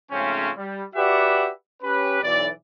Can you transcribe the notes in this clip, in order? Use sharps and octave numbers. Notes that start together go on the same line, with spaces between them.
G#2 C#3 F3 A3 C4 C#4
G3
F#4 G4 B4 D5 E5 F#5
C#4 G4 B4
B1 E3 D5